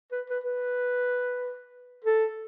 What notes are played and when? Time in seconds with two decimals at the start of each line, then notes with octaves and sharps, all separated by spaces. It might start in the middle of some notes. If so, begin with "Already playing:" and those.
0.12 B4
0.30 B4
0.44 B4
2.04 A4